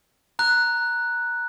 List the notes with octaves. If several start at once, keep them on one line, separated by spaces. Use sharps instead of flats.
A#5 F#6